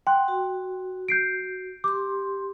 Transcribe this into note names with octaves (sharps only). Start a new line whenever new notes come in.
F#5 G5 C6 F#6
F#4
G6 C7 D7
G4 C6 D6